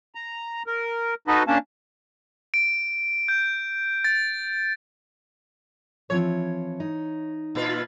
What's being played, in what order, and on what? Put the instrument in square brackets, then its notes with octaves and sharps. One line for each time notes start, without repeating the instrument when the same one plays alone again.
[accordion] A#5
A#4
D#4 F#4 A4 B4 D#5
A#3 C#4 D4 A5
[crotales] D7
G6
A6
[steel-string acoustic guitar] E3 F3 C4 [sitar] C#5
[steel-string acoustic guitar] D#4
[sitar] A#2 F4 B4